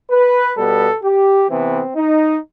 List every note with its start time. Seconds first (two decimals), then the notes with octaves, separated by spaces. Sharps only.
0.11 B4
0.56 B2 G3 B3 A4
1.03 G4
1.49 C3 E3 B3 C4
1.96 D#4